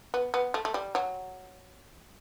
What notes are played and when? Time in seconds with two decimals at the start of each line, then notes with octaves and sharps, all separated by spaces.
0.14 B3
0.34 B3
0.54 A3
0.65 A3
0.74 G3
0.95 F#3